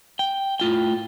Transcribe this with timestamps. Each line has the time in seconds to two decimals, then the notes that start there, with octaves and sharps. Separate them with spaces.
0.19 G5
0.60 A2 F4 G5